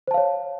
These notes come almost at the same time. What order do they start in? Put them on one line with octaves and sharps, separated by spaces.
C5 A5 F5 C#5